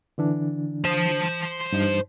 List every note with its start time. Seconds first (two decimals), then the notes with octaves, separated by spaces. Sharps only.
0.18 D3 E3 D4
0.85 C5 A5
1.73 G2 D#4